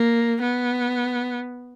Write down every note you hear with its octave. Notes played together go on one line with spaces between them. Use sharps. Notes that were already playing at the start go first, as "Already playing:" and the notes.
Already playing: A#3
B3